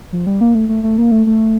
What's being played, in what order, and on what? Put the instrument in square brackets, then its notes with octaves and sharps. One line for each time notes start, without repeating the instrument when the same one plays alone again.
[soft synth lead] F3
G3
A#3
A3
A3
A3
A#3
A3
A3